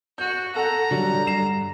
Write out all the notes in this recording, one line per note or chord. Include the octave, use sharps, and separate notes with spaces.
F#4 G6
A4 F#5 A#5
D3 F#3 G3
G2 C7 E7